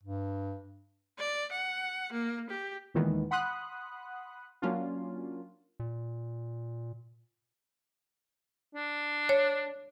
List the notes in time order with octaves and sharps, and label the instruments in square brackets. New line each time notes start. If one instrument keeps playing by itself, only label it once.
[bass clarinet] G2
[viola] D5
F#5
A#3
G4
[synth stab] D#2 A#2 D#3 E3 G#3 B3
F#5 B5 C6 D#6 F#6
F#3 A#3 C#4 D4 F4
[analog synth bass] A#2
[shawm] D4
[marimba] C#5